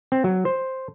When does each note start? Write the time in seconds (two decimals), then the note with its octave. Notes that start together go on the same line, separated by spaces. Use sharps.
0.12 C4
0.24 F#3
0.45 C5